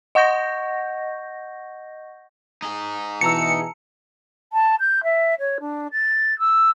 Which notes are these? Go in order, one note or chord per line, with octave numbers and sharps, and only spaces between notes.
D#5 F#5 C#6 G6 A#6
D#4 G#4
B2 E3 A5 A#5 E6 C#7
A5
G6
E5
C#5
D4
A6
E6